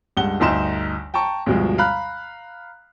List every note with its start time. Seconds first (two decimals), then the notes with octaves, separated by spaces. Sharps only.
0.17 C#2 G2 F#5 G7
0.40 G1 D2 D#4 C6 E7
1.14 G5 A5 A#5 C#6
1.46 D2 G2 B2 F3 G#3
1.78 F5 A#5 B5 F#6